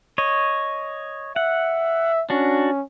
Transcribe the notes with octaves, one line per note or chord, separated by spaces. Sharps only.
C#5 D#5
E5 F#5
C#4 D4 F#4